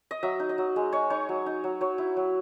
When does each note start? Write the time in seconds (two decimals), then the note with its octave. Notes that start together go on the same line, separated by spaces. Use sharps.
0.11 D#5
0.23 F#3 E5
0.40 D#4
0.49 D#5
0.58 F#3
0.76 G#3
0.93 G#3 C#5
1.10 D#4 C#5
1.29 F#3
1.46 D#4
1.64 F#3
1.81 F#3 C#5
1.98 E4
2.17 F#3